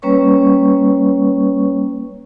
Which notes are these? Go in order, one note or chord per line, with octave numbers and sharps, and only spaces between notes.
G3 A#3 C#4 B4 C#5 C#6